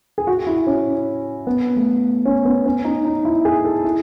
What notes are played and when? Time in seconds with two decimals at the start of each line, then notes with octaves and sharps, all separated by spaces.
0.18 G#4
0.27 F#4
0.47 E4
0.67 C#4
1.47 B3
1.76 A3
2.26 C#4
2.45 B3
2.66 C#4
2.85 D#4
3.05 D#4
3.25 E4
3.45 G#4
3.65 A4
3.84 E4